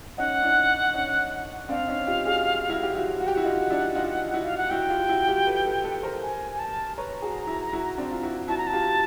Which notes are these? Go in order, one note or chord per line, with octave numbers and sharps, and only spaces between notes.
C#4 D#4 F#5
D4 E4
C#4 D#4
C4 D4 F5
C#4 D#4
F4 G4
F#4 G#4
E4 F#4
G4
E4 F#4
F#4 F#5
G4 G5
E4 F#4 F#5
D#4 F4
D4 E4
D#4 F4
E4 F#4
F5
F#5
E4 F#4 G5
F4 G4
E4 F#4
F4 G4
A4 B4
A4 B4
A4 B4
A#4 C5
G#5
A5
B4 C#5 A#5
F#4 G#4
E4 F#4
E4 F#4
C4 D4
F4
E4 F#4
E4 F#4 A5
A#5
A5
F4 G4